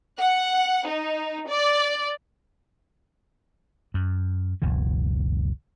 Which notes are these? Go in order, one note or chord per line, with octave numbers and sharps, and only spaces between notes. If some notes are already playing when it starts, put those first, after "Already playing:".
F#5
D#4
D5
F#2
F#1 C#2 B2 E3